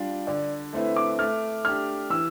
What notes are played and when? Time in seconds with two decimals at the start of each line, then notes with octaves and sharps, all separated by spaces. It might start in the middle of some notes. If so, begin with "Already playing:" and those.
Already playing: G3 D4 F4
0.27 D3 D5
0.73 A3 C4 E4 B4
0.96 D6
1.19 A3 F6
1.65 D4 G4 F6
2.10 E3 E6